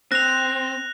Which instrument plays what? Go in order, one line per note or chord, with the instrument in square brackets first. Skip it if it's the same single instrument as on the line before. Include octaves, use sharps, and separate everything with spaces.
[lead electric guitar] C4 [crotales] F#6 [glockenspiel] A#6 F7